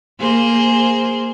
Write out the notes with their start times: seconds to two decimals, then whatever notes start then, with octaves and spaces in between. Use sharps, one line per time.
0.20 A#3 G#4 C5